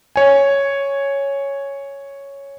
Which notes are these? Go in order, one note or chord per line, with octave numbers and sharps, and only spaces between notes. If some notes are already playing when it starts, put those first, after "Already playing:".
C#5 G#5